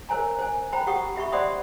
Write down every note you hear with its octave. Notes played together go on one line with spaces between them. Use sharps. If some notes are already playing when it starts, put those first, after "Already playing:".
A#4 C5 C#5 G#5 A#5
C5 G#5
C5 G5 A#5 B5
G4 F#5 G5 C#6 D#6
G4 E5 B5 C#6
C5 D5 F#5 B5 C6 D#6